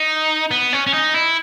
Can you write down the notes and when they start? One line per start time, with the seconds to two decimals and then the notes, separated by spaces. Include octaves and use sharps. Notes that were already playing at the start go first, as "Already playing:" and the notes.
Already playing: D#4
0.51 B3
0.73 C#4
0.87 C#4
0.93 D#4
1.14 E4